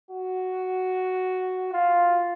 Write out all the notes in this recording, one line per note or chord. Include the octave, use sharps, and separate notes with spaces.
F#4
F4